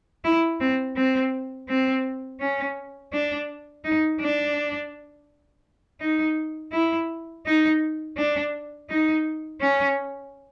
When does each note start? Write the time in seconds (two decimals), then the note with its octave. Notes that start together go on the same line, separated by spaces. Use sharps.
0.24 E4
0.61 C4
0.96 C4
1.69 C4
2.40 C#4
3.13 D4
3.84 D#4
4.21 D4
6.01 D#4
6.73 E4
7.46 D#4
8.17 D4
8.90 D#4
9.61 C#4